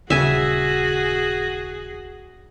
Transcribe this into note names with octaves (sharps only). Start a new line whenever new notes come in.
D#1 C#3 F#4 G#4 E5 G#5